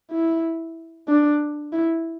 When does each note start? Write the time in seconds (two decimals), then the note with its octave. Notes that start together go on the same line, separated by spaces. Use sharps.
0.11 E4
1.08 D4
1.72 E4